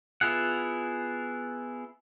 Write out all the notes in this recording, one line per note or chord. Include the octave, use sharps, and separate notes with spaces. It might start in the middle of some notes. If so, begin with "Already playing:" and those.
B3 E4 F4 G#4 F#5